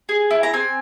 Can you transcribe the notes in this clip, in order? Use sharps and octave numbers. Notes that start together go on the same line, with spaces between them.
G#4
E4
A#5
C4 G#5